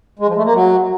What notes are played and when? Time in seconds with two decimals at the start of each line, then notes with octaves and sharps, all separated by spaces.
0.19 G#3
0.28 F3
0.36 A3
0.45 A#3
0.54 F#3